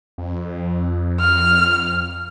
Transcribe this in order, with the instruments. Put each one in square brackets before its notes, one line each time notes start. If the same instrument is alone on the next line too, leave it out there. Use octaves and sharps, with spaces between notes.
[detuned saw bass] F2
[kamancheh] F6